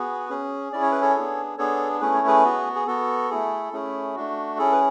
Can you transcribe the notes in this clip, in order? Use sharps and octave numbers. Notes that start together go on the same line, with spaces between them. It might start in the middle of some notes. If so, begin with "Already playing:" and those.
Already playing: B3 F#4 G#4 B4
C#4 G#4
C#4 E4 G#4 D5
C#5
B4
A4 C#5
B3 D4 G#4
B3 D4 G#4 A4 C#5
A3 C#4 E4 G#4 B4
C#5
G#4 B4
B3 F#4
G#4
B3 F#4 A4
A3 E4 G#4
A3 C#4 E4 G#4
A3 D4 F#4
C#4 E4 G#4 A4
B4